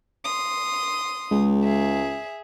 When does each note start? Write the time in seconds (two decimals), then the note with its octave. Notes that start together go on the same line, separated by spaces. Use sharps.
0.24 C6 D#6
1.31 C#2 G#3
1.64 G#4 E5